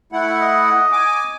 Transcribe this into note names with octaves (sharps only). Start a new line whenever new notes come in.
A3 E4 F#5
D#5
G#5 D6